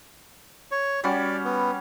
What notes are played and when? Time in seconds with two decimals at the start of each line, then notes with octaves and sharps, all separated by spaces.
0.71 C#5
1.04 G3 C#4 F#4 D5
1.45 B3